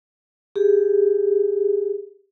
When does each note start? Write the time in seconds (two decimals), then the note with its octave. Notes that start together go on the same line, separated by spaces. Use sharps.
0.56 G4 G#4